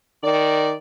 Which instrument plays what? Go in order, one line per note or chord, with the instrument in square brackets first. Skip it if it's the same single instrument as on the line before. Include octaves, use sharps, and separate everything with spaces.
[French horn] D#3 [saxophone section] D5